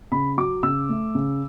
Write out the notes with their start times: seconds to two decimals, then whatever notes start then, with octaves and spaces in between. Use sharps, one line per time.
0.12 C#3 B5
0.37 F#3 D6
0.63 C#3 E6
0.89 A3
1.15 C#3